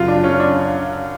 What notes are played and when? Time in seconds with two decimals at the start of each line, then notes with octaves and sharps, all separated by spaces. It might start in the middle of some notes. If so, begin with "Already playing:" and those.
Already playing: F#2 C#3 F#3 F4
0.08 D4
0.24 C#4
0.40 D4